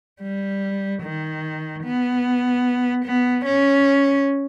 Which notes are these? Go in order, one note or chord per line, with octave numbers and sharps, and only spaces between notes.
G3
D#3
B3
B3
C#4